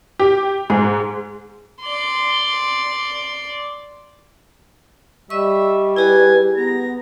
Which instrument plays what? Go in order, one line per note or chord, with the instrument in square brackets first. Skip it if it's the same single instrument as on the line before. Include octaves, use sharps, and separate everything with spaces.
[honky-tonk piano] G4
[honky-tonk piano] G#2 [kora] G#4
[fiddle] D5 C6
[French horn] G3 [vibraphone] D#5 C#6 [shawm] E5
[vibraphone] E4 G4 G#4 [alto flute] B4 [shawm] G#5
[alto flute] B3 [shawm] A#5